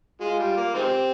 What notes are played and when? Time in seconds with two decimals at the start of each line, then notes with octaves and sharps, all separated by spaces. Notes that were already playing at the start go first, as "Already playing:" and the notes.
0.21 G#3 F4
0.39 G3
0.57 A#3
0.74 D#3 G#3 C4 G4